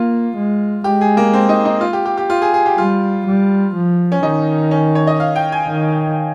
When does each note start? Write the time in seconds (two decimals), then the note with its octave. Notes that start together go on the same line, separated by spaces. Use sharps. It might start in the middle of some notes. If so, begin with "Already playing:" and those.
Already playing: A#3 F4
0.36 G#3
0.84 G#3 G4
1.01 G#4
1.17 A#3
1.33 C4
1.49 D#4
1.65 D#4
1.81 F4
1.93 G4
2.05 G4
2.17 G4
2.30 F4
2.42 G#4
2.54 G#4
2.66 G4
2.77 G3 F4
3.26 G3
3.75 F3
4.12 C#4
4.22 D#3 D#4
4.71 C#4
4.95 C#5
5.07 D#5
5.20 F5
5.36 G5
5.52 G#5
5.67 D#3